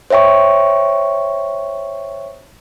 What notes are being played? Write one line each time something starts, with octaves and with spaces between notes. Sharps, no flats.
C5 C#5 E5 G5 C#6